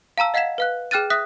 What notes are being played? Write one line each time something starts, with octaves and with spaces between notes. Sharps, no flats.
F5 A5 A#5 E6
D#5 F5 F#5 G#6 B6 E7
B4 F5 F#6
G#4 G5 F6 F#6 A6 D#7
E5 D#6 F#6 B6